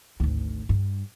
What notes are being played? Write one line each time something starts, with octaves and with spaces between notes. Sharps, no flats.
G#1 D2
G2